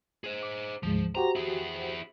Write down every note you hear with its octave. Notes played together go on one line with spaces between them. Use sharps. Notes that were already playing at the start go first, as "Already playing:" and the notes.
G#4 C5
D6
D2 G#2 F3 G#3
F#4 G4 C5 A#5
E4 G#4